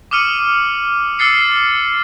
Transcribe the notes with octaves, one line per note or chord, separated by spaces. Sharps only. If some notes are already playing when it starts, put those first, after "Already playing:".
D6 D#6 F6 C#7 D#7 F#7
D6 E6 F6 A6 C7 C#7